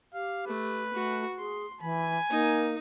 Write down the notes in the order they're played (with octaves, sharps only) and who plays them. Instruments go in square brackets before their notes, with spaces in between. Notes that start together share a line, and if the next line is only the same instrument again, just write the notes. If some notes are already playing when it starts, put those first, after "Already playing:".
[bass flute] G4 [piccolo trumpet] F5
[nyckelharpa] A3 [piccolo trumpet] B4
[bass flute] A3 [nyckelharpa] F#4
[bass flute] G#4 [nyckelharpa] C6
[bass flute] E3 [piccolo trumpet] G#5 [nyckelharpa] B5
[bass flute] A#3 [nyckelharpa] D#4